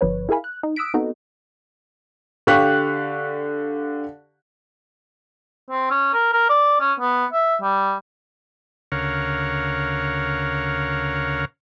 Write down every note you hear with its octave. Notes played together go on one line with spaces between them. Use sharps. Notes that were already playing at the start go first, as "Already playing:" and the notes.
G1 F3 B4 C#5
E4 G#4 A#4 F5 G#5 B5
F#6
D#4
D#6 E6 F#6 B6 D7
B3 C4 D#4 F#4 A4
D3 G4 F5 C#6 F#6 B6
C4
C#4
A#4
A#4
D5
C#4
B3
E5
G3
D2 C#3 A#4 C#5 F5 F#5